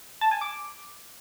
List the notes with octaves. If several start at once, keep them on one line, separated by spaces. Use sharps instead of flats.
A5
G#5
D6